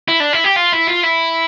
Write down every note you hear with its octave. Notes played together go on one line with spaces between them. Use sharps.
E4
D4
E4
G4
F4
E4
F4
E4